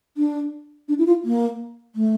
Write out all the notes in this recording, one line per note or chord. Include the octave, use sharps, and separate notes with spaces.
D4
D4
E4
F4
A#3
A3